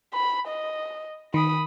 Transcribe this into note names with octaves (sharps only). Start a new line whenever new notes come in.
B5
D#5
D#3 B5 D#6